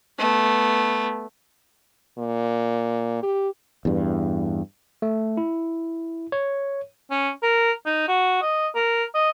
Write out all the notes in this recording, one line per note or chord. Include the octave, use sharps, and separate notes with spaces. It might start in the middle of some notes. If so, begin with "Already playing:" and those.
A3 B3
A#2
G4
E2 G2
A3
E4
C#5
C#4
A#4
D#4
F#4
D#5
A#4
D#5